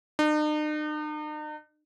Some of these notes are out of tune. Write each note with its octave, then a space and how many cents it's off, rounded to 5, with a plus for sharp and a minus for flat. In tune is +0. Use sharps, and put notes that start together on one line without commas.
D#4 -45